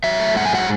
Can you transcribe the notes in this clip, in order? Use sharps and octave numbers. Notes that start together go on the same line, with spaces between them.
F#3 E5
A3
G#2 F#5
G#5
F#3 F#5